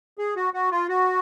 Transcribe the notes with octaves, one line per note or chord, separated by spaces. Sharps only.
G#4
F#4
F#4
F4
F#4